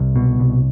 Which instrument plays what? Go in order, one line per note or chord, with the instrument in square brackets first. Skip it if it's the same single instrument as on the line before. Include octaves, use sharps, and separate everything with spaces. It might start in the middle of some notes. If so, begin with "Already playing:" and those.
Already playing: [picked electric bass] C2
B2
C2